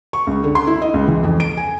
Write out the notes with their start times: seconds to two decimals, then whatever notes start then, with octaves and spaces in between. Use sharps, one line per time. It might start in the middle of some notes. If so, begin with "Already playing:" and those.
0.13 C#6
0.27 C#2
0.44 D3
0.55 C6
0.67 E4
0.82 D#5
0.94 C#2
1.08 E3
1.23 F2
1.40 D7
1.57 G#5